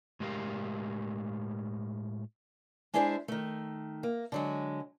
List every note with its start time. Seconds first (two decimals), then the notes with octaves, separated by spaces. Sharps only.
0.20 A2 G#3 G4 A#4 F5
2.94 G#3 D4 E4 G#4 B4 C5
3.28 D#3 A3
4.03 A#3
4.32 D3 F#3 G#3